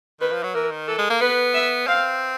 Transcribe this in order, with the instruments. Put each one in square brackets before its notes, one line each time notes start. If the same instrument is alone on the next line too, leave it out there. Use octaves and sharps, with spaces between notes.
[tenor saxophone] D#3 [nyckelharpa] B4
[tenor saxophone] F3
F#3
[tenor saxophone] E3 [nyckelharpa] A#4
[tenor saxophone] D#3
[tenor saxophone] E3 [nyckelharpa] A4
[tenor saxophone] G#3
A#3
[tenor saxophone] B3 [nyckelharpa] B4
[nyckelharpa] E5
[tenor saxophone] C4 [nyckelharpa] F5